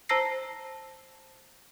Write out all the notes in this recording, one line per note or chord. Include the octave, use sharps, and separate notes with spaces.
C5 A5 A#5 E6 A#6 C7